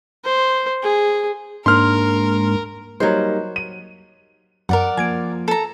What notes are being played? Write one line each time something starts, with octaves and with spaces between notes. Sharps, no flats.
C5
G#4
G#2 A#3 D4 A#4 C6 F6
F#3 G3 A#3 D#4 C5
D#7
F#2 A#4 D5 F#5
F3 A#3 G#5 G#6 D7
A4 A#5